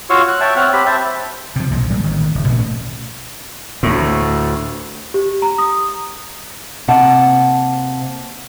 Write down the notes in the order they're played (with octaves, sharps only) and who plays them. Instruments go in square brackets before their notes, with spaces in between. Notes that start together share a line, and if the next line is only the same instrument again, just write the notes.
[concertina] F4 F#4 C#5 F5 C#6 E6
F#6
C#5 E5 G5 A5
C4 C#5 F#5 F6
C4 G4 B5
C5 E5 A5 B5
[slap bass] C3 F3
B1 A#2 F3
D1 A#2 G3 G#3
A1 D#3
F1
A1 A#2 A3 C#4
D2 A2
[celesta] G4
A#5
D#6
[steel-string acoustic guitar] C3 A#3 F#5 A5